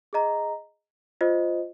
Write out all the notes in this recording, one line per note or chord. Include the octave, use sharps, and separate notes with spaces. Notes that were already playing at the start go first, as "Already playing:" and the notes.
G#4 D#5 A#5
F4 C5 D#5